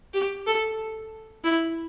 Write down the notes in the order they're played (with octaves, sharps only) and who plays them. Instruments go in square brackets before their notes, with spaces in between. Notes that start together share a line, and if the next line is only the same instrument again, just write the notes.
[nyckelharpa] G4
A4
E4